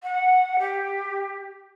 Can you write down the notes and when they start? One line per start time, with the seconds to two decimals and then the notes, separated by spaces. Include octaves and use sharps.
0.03 F#5
0.59 G4